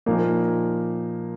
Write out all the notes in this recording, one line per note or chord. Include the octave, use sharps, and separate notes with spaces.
A#2 F3 A#3 D#4 A#4